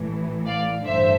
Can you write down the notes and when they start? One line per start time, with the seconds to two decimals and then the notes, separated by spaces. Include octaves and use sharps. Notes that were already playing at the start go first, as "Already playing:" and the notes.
Already playing: A1 A2 E3
0.46 D5 F5
0.85 A1 G2 D3 C5 E5